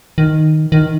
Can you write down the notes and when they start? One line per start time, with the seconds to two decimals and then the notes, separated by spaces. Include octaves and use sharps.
0.18 D#3
0.72 D#3